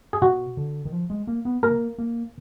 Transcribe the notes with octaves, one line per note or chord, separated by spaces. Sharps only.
G#4
B2 F#4
D3
D#3
F3
G#3
A#3
B3
A#3 A#4
A#3